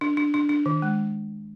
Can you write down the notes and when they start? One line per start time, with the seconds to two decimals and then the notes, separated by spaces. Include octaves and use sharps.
0.01 D4
0.17 D4
0.34 D4
0.49 D4
0.66 D#3
0.82 G#3